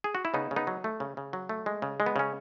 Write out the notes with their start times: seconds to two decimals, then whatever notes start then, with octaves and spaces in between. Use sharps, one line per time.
0.04 G#4
0.15 F#4
0.25 E4
0.34 C#3 B3 D#4
0.51 C#3
0.56 B3 D#4
0.67 F#3
0.84 A3
1.00 C#3
1.17 C#3
1.33 F#3
1.49 A3
1.66 G#3
1.82 C#3
2.00 G#3
2.06 B3
2.16 C#3 C#4